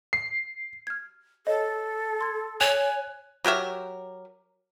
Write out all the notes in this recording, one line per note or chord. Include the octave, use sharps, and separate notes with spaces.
C7
F6 G#6
A4 C#5 D#5
C6 G#6
C#5 G#5 F#6
F#3 G4 A#4 E5